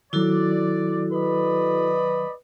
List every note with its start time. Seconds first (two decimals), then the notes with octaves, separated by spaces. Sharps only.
0.13 D#3 F#3 E4 F#4 A4 D5
1.13 B4 D5 D#5 B5